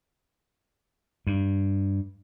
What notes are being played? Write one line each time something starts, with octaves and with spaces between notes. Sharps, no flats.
G2